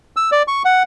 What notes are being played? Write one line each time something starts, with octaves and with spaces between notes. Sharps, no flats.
E6
D5
C#6
F#5